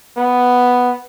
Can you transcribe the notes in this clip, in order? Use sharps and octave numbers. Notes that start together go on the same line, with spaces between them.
B3